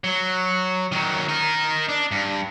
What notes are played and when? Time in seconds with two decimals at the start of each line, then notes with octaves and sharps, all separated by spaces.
0.04 F#3
0.92 D#3 F#3
1.29 D#4 A#4
1.89 D4
2.11 G2